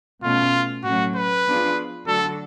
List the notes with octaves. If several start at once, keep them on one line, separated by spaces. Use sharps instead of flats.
B2 A3 C#4 F4
A2 F#3 A3 C#4 F#4
B4
F3 B3 D4 F4 G#4
D3 F#3 A3 D4 F#4 A4